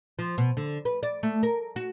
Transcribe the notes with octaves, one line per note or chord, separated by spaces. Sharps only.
F3
B2
D3
B4
D5
A3
A#4
F#4